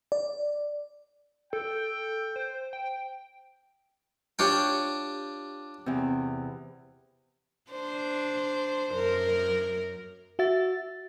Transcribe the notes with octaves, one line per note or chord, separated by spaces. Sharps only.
D5
A4 G5
C5
G5
D4 F4 G4 C#5 G5 C#6
E2 C3
D4 C5
F#2 A#4
F#4 E5 A6